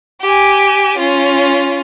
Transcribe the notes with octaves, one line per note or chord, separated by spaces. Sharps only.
G4 G#5
C#4 F4